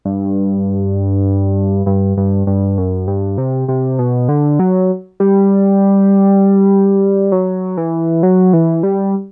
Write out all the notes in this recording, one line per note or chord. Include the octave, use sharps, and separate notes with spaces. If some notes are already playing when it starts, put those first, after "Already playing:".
G2
G2
G2
G2
F#2
G2
C3
C3
B2
D3
F#3
G3
F#3
E3
F#3
E3
G3